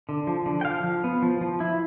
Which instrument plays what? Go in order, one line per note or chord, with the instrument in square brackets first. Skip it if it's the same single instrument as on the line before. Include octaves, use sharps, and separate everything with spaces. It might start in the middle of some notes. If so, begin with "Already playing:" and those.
[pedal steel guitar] D3
F3
D3
G5
F3 F5
F3
B3
F3
F3
E4